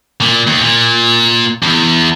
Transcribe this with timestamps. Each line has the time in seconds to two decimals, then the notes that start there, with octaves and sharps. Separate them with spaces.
0.21 A#2
0.47 D#2
0.61 A#2
1.63 E2